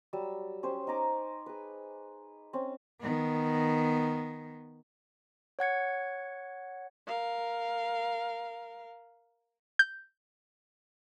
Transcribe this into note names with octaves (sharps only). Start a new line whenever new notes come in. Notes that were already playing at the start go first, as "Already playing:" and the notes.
F#3 G3 E6
C#4 G4 C5
D#4 G#5 A#5 D6
G#4 B4
C4 C#4
D#3 B3
C#5 F#5 G#6 C#7
A#4 F5
G6